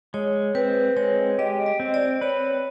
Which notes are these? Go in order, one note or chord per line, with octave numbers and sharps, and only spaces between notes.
G#3 C#5
C4 B4
G#3 C#5
G4 D#5
D#5
C4
D5
B4 C#5